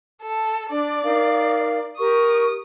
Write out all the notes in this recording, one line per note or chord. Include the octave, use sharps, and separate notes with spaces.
A4
D4 D5
D#4 A#4 F5
G4 A#4 C#6 D#6